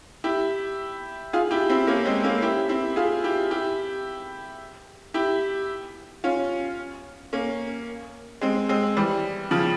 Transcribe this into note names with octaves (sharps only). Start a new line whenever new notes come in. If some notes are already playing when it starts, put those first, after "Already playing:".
E4 G4
F4 G#4
E4 G4
C4 E4
A#3 C#4
G#3 C4
A#3 C#4
E4 G4
C4 E4
F4 G#4
E4 G4
E4 G4
E4 G4
C#4 F4
A#3 C#4
G#3 C4
G#3 C4
E3 G3
C#3 F3